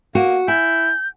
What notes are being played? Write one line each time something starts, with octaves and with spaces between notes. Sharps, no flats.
A#3 F#4
E4 G#5 G6